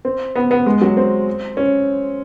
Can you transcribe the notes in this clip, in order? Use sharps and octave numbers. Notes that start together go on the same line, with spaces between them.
C4
B3
B3
G#3
F#3
C4
C#4